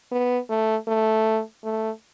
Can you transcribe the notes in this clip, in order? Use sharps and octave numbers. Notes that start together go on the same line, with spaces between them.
B3
A3
A3
A3